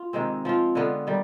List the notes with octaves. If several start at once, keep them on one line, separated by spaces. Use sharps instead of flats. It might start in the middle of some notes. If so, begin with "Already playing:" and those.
Already playing: F4
C3 D#3 G#3 C4
F3 C4 F4
D3 G#3 B3 F4
D#3 G3